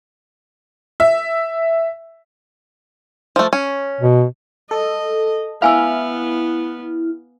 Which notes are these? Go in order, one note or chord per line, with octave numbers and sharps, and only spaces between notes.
E5
F3 A3
C#4
B2
A4 D#5
B3 E4 F5 G#5 E6 F6